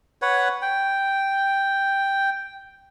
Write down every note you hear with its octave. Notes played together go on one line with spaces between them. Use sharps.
B4 C#5 F#5
G5